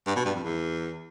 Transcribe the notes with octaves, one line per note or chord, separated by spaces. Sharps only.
G2
B2
G2
F2
E2